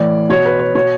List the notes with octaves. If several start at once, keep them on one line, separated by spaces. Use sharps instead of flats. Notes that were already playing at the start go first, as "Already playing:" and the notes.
Already playing: A2 E3 D5
B2 C#5
B4
C#5
B2 C#5